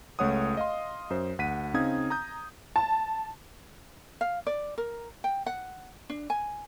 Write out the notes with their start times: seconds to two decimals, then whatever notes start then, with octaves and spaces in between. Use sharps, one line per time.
0.19 C#2 A3 C#5 F#5 D#6
0.57 D#5 F5 C6
1.10 F#2 C5
1.39 D2 F#5 B6 D#7
1.74 C#3 C4 D#4 F5 D#6 G#6
2.10 A#5 D#6 G6
2.76 A5
4.21 F5
4.47 D5
4.78 A#4
5.24 G5
5.46 F#5
6.10 D4
6.30 G#5